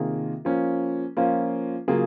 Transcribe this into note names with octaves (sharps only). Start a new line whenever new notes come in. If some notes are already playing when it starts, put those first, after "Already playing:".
Already playing: C3 D#3 A#3 F4 G#4
F3 A#3 C#4
F3 A#3 C#4 F4
C#3 F#3 A#3 F4 G#4